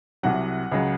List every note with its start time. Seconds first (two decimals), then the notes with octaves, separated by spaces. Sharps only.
0.23 C2 C3 F#3 F#5
0.71 C#2 C#3 F#3